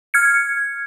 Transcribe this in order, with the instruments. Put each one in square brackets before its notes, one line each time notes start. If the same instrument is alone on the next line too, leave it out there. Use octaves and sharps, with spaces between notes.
[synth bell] F6 G#6 C#7